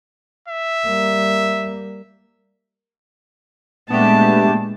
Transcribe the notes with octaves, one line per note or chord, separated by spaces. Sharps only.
E5
G3 A#3
A#2 G#3 A3 B3 D4 G4 A5